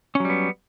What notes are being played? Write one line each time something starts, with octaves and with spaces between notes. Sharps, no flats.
F#3 G3 B3 C#4